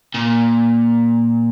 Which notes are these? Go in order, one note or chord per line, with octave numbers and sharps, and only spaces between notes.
A#2